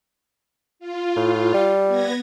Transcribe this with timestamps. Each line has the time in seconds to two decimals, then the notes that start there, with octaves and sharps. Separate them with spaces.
0.79 F4
1.16 A2
1.54 G3
1.87 B3 G#6 A#6